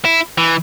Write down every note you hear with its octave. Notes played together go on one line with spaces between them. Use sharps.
E4
E3